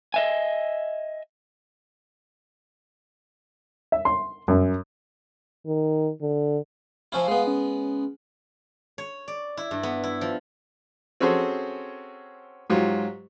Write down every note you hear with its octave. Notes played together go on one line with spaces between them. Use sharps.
D#5 E5 G#5
E5
C6
F#2
D#3
D3
F3 C#4 E4 F5
G#3 B3
C#4
C#5
D5
E4
G2
B3
E4
F3
C4 C#4 F#4 G#4 A4 C5
G#2 F#3 F4 G4